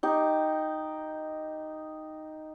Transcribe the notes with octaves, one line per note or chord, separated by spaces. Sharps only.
D#4 G4